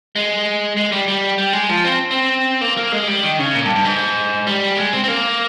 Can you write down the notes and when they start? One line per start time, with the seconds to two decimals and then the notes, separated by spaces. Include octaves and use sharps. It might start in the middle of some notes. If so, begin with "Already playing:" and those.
0.16 G#3
0.77 G#3
0.92 G3
1.08 G3
1.38 G3
1.53 G#3
1.69 F3
1.85 C4
2.11 C4
2.61 A#3
2.77 A#3
2.92 G#3
3.07 G3
3.23 D#3
3.39 C#3
3.55 A#2
3.65 G2
3.75 G2
3.85 G#2
4.47 G3
4.77 G#3
4.93 C4
5.04 C4
5.08 A#3